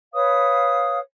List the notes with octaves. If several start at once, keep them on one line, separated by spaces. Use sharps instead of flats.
B4 C#5 F5 D#6